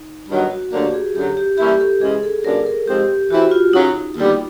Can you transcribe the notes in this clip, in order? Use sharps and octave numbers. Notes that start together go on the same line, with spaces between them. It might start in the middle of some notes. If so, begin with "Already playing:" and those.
Already playing: D#4
G2 D#3 F#3 B3
F#4
D2 D3 F#3 A#3 D4 G4
G#4
F#2 D3 F#3 G4
G4
E3 G3 A#3 C#4 E4 G4
A4
C#3 E3 G#3 G#4
A4
F#2 C#3 F#3 A#3 D4 A#4
A#4
G#2 F3 G#3 C4 G4
E3 A3 C4 E4 F#4
F4
F#2 C#3 F#3 D#4
D#2 D3 G3 B3